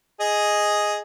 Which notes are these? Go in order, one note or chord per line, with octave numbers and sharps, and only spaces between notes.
G#4 D#5